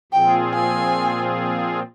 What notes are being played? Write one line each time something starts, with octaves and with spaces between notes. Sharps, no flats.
A#2 F3 C4 F4 G#4 G5
G#5